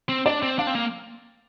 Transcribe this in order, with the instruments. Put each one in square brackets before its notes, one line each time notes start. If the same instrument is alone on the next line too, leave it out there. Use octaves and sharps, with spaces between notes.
[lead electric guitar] C4
[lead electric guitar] D4 [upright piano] D5
[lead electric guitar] C4
[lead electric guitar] D4 [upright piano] F5
[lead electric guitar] C4
A#3